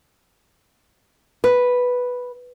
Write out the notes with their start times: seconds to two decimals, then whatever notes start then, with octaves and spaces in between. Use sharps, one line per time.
1.44 B4